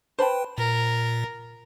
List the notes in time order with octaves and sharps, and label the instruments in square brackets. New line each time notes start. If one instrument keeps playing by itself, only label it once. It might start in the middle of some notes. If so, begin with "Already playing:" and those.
[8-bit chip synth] B4 G5 [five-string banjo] C5 A5 B5
[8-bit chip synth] A#2 [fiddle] A#4